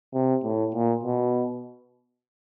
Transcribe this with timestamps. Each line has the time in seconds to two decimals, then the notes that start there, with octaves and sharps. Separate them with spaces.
0.14 C3
0.44 A2
0.74 A#2
1.03 B2